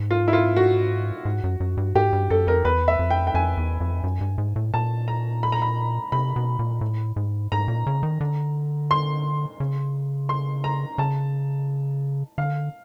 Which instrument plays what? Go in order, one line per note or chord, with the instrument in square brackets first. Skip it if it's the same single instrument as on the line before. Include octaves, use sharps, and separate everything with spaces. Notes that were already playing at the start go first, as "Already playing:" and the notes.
Already playing: [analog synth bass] G#2
[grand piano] F4
E4
F4
F#4
[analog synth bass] G#2
F#2
F#2
G2
[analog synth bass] G#2 [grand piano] G4
[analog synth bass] G2
[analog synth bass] F#2 [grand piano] A4
[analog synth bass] F2 [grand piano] A#4
[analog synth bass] E2 [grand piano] B4
[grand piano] E5
[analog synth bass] F2
[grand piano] G5
G5
[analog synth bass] F2 [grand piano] G#5
[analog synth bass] E2
F2
F#2
G2
G#2
A2
[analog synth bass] A#2 [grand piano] A5
[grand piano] A#5
B5
A#5
B5
[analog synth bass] C3 [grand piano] B5
[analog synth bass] B2
A#2
A2
G#2
[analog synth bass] G#2 [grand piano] A#5
[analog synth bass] A#2
C#3
D#3
D3
[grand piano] C6
[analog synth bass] C#3
[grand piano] C6
A#5
[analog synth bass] C#3 [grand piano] A5
[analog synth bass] D3 [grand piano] F5